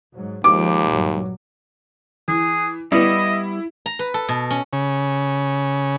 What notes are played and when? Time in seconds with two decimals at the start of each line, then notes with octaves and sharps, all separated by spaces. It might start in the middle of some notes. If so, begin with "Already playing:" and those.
0.14 G#2 F#3
0.44 D#2 F3 G#3 D6
0.87 A#1 G2 F#3
2.28 E3 G#4
2.92 G3 B3 E4 D#5
3.86 A#5
3.99 B4
4.14 A4
4.29 B2
4.50 C#4
4.73 C#3